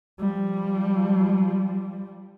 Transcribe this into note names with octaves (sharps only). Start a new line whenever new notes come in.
F3 G3